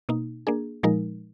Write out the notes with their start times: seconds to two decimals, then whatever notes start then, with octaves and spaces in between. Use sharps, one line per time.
0.09 B2 A#3 D#4
0.47 A#3 D4 G#4
0.83 A#2 F3 G#3 D#4 A#4